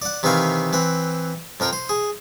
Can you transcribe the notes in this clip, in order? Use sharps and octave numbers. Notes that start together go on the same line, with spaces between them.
D5 F#5
C3 D#3 E3 C4 F5 C#6
E3 C4 F#5
F2 F3 A#4 G5
C5
G#4